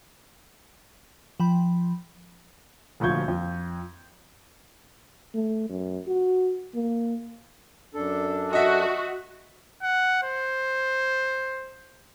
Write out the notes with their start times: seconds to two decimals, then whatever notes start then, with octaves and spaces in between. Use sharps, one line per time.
1.40 F3 G5 B5
3.00 D#1 D2 F3 C#6 G6 G#6
3.28 F2
5.34 A3
5.69 F#2
6.07 F#4
6.75 A#3
7.94 F#2 D4 A4
8.53 F#4 D#5 E5
9.83 F#5
10.23 C5